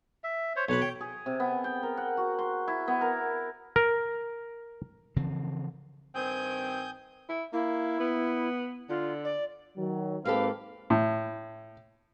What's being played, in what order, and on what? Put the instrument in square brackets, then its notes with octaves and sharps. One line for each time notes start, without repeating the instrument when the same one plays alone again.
[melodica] E5
C5 C#5
[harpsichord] B1 B4 B5 [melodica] C#5
[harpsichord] G5
[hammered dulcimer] G#4
C3
B3
G5
A#4
F#5
F#4
C6
E4
B3
A#4
[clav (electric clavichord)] A#4
[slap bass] C#3 E3 F3 C4
[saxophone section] G2 D#3 C4 [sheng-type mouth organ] G#5 D#6 G6
[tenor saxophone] E4
[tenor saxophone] A#3 [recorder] E4
[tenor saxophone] B3
[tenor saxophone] D3 [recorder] F4
[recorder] D5
[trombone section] D#3 F#3
[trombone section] G#2 C4 B4 [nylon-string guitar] A#3 G4 A4 [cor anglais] F5
[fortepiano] A2